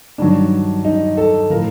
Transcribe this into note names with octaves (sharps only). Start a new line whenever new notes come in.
G2 D#3 F#3 D4
D#4
A4
A2 F3 A#4